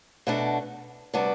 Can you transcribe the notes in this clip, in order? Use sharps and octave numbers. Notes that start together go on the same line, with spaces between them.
B2 A3 D4 F#4
C3 G3 B3 D4 F#4